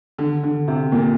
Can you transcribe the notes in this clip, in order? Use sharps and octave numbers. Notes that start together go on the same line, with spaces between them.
D3
D3
C3
A#2